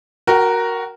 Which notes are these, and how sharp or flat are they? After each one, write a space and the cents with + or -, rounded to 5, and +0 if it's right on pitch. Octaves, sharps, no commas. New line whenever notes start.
F#4 +0 A#4 +0 G5 -40